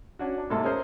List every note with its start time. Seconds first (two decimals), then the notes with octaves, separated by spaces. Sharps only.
0.19 C#4 D4 F#4
0.38 D4
0.50 G#2 C3 A#3 A4 C6
0.63 C#4 G#4 A#4 C5